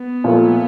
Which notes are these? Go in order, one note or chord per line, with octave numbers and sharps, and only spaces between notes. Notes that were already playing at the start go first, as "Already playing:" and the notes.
Already playing: B3
A#2 F3 A3